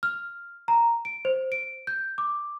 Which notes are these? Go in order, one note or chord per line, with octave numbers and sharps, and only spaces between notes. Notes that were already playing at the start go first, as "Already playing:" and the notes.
F6
A#5
D7
C5
D7
G6
D6